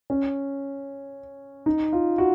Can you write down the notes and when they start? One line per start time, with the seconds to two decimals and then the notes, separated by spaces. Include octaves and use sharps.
0.10 C#4
1.66 D#4
1.93 F4
2.18 F#4